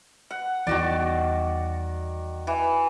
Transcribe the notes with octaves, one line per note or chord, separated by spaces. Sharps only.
F#5
E2 D#3 G3 F#4 D5
E3